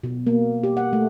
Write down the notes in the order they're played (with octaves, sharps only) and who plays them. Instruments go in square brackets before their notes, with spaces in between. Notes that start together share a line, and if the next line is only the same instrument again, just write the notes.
[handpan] B2
A#3
G4
F#5
A3